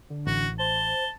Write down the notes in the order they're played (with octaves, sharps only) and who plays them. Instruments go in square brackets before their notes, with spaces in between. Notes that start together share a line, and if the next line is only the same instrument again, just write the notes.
[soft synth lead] D3
[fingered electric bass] A1 [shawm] F#4
[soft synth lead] C5 [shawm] A5 [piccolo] G7